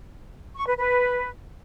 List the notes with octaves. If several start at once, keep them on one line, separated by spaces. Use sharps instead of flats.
C#6
B4
B4